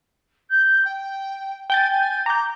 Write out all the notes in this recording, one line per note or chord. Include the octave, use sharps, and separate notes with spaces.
G6
G5
G5 G#5 G6 A6
G#5
A#5 D6 G6